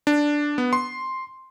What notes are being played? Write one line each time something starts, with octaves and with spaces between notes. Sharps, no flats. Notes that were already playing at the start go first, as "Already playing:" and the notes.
D4
B3
C6